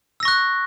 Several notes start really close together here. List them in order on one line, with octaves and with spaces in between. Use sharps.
E6 A#6 C#6 F#6